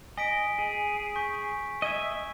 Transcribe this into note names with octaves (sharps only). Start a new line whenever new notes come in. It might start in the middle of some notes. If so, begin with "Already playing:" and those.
D#5 G#5 B6 D7
G#4
C#6 G6 B6
D#5 E5 G#6 D#7